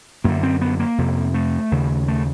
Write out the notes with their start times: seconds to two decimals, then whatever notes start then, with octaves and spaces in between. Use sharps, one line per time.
0.24 F#2 D3 A#3
0.43 C4
0.61 B3
0.79 A#3
0.98 F2 C3
1.34 A3
1.71 D#2 C#3
2.08 A3